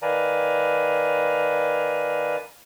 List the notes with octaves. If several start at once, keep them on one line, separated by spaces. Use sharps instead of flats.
D#3 B4 D5 F5 G#5 A#5